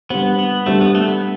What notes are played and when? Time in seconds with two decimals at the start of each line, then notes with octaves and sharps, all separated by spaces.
0.10 G3 B3 D4 G4 C5
0.39 B3
0.66 G3 A3 D4 G4 C5
0.81 B3
0.95 A3
1.08 B3